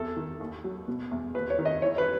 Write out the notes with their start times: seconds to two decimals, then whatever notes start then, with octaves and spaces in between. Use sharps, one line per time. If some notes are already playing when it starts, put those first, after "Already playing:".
Already playing: E2 A4
0.17 D#3
0.40 D#2
0.64 F#3
0.88 B2
1.11 E2
1.34 D#2 B4
1.50 C#5
1.59 D#3
1.65 D#5
1.82 E3 C#5
1.98 B4